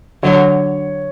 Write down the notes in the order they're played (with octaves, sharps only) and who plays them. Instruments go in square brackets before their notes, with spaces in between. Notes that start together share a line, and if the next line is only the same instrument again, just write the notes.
[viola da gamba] D3 F#3 [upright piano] C#5